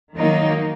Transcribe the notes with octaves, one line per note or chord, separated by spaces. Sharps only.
D#3 F#3 A#3 D#4